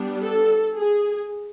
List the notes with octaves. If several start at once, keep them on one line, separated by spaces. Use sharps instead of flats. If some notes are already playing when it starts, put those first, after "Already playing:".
Already playing: G3 B3 D4
A4
G#4